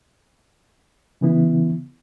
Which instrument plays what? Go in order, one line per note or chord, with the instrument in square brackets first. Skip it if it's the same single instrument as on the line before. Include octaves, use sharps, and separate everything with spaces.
[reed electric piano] C#3 E3 B3 E4